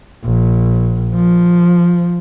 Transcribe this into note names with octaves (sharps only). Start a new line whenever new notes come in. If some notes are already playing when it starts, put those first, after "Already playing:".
A#1
F3